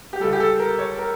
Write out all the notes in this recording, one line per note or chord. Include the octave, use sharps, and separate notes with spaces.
G4
C#2 C#3 G3 A4
G4
A4
A#4
C#5
A#4